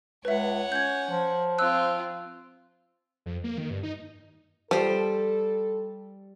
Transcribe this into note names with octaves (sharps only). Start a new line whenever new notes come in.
C#2 B4 C#5 E5 F#5
C#4 G6 G#6
F3
C4 F4 E6 F#6
F2
A#3
D#3
G2
D#4
F3 G3 A4 C5